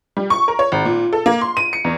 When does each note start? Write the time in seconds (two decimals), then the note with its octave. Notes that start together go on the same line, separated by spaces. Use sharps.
0.17 G3
0.30 C#6
0.48 A#4
0.59 C#5
0.72 G#1
0.85 A#2
1.13 A4
1.26 A#3
1.41 C6
1.57 D#7
1.73 C#7
1.85 E2